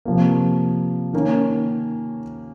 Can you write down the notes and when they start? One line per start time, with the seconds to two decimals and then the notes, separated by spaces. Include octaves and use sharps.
0.05 C3 F3 A#3
1.13 D#3 A#3 C#4